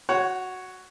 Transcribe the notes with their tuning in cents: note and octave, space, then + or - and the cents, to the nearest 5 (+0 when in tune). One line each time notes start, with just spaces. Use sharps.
F#4 +0 C#5 +0 F#5 +40